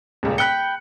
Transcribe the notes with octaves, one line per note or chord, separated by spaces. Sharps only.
D#1 C#2
G5 B5 F#6 C#7